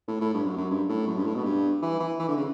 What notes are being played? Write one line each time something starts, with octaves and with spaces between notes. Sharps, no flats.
A2
A2
G2
F#2
F#2
G2
A2
F#2
G2
A2
B2
G2
E3
E3
E3
D3
C#3